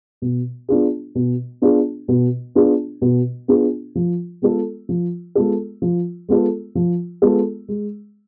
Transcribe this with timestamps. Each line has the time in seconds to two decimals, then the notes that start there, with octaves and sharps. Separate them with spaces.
0.22 B2
0.69 B3 D4 F4 G#4
1.15 B2
1.62 B3 D4 F4 G#4
2.08 B2
2.55 B3 D4 F4 G#4
3.02 B2
3.48 B3 D4 F4 G#4
3.95 F3
4.42 G#3 B3 F4 A4
4.89 F3
5.35 G#3 B3 F4 A4
5.82 F3
6.29 G#3 B3 F4 A4
6.75 F3
7.22 G#3 B3 F4 A4
7.68 G#3